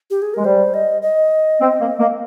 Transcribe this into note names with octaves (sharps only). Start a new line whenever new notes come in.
G4
G#4
G#3 A#4
G3 C5
D#5
D#5
C4
A#3
A#3